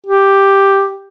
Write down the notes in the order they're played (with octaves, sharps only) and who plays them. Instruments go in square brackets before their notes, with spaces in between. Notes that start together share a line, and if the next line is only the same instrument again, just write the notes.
[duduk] G4